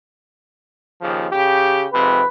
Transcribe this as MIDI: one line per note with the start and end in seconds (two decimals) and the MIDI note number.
1.01 1.28 39
1.01 1.28 49
1.01 1.28 53
1.31 1.84 49
1.31 1.84 67
1.93 2.20 41
1.93 2.20 44
1.93 2.20 48
1.93 2.27 71